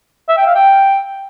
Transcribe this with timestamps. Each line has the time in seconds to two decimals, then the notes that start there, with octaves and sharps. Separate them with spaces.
0.29 E5
0.38 G5
0.46 F5
0.55 G5